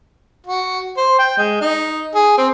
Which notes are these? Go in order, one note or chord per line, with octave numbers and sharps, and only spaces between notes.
F#4
C5
G5
G#3
D#4
G#4
C4